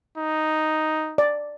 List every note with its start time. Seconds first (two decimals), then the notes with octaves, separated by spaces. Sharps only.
0.17 D#4
1.18 D5